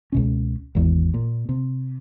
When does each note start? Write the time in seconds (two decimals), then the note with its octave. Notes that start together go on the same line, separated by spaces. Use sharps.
0.12 C#2 B2 C#4
0.75 G#1 E2
1.14 A#2
1.49 C3